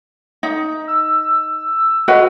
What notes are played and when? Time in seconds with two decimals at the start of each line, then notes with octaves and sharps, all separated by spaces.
0.43 D#4
0.87 E6
2.08 F#4 B4 D#5 F5